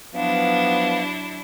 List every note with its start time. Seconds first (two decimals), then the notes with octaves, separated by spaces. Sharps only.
0.15 F3 F#3 B3 D4 E4 F5